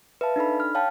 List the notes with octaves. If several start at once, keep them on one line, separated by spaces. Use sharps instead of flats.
B4 E5 F5 A5
D4 D#4 A4 B5
F6
C#5 F5 G5 A5